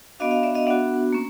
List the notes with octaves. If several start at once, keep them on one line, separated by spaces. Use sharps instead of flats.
B3 D4 F#4 D#5 F5
D#5 F5
D5 E5
D#5 F5
B3 D4 F#4 E5 F#5
A#3 C#4